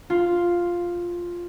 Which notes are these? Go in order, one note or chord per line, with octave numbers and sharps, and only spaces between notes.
F4